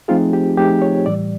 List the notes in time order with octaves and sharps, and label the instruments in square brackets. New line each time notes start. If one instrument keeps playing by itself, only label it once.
[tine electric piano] F3 A3 C4 D#4 G#4 [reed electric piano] F4
[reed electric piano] G4
[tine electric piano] F3 A3 C4 D#4 G#4 [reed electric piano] G4
[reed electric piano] C#5
[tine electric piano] A2 E3 G3 [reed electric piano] D5